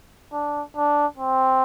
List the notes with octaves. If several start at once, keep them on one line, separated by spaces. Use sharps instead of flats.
D4
D4
C4